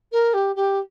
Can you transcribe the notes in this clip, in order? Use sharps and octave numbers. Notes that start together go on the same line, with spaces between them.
A#4
G4
G4